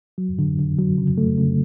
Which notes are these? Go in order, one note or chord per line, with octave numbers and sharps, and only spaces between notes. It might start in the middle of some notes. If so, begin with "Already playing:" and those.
F#3
D3
D3
F#3
C#3
A3
C#3